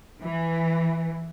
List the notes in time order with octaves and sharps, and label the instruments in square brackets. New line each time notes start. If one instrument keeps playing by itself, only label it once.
[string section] E3